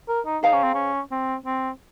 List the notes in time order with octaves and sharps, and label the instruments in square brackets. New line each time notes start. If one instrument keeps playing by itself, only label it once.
[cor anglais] A#4
D#4
[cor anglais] D#4 [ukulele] G#4 C5 F5 A#5
[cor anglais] C#4
C4
C#4
C4
C4